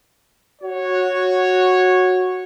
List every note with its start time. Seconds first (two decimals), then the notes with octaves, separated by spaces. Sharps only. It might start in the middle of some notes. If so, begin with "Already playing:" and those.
0.62 F#4 C#5